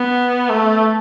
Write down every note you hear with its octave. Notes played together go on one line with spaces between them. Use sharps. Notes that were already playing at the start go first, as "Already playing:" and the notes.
Already playing: B3
A3